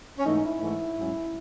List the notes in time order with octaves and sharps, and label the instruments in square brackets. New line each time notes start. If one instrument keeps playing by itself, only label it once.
[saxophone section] C#4
G#2 E3 A3 D#4
E4
G#2 E3 A3
G#2 F#3 C#4